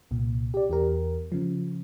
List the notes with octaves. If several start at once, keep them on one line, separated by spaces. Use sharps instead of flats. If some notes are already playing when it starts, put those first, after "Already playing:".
C2 A#2
G4 D5
E2 G4 A#4
C#3 F3